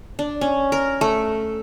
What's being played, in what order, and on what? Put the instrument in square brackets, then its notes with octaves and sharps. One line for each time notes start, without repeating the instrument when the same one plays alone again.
[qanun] D4
C#4
A#4
A3